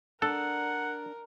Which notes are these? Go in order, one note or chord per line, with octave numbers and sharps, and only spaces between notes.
D4 A4 A#4 F#5